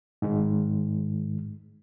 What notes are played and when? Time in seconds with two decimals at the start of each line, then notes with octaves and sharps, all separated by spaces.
0.22 G#2 D#3 G#3